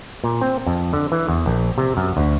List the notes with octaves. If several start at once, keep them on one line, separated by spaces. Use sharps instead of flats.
A#2
C4
F2
D3
E3
E2
A#1
C3
F#2
D2